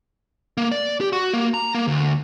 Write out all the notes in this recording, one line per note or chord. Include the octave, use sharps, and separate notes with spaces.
A#3
D5
G4
F#4
A#3
A#5
A#3
D2